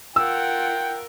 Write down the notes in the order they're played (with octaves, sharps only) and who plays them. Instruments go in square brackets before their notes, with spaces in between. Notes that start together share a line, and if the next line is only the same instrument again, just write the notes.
[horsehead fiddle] F4 F#5 [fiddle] A#4 [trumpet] G5 [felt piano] E6